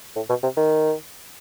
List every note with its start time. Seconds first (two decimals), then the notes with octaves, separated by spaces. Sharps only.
0.16 A2
0.30 B2
0.43 C3
0.57 D#3